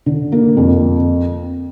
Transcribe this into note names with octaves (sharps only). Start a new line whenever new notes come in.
D3
A#3
F2